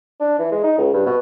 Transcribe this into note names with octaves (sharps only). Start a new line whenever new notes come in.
D4
E3
G#3
D#4
C#2
G2
B2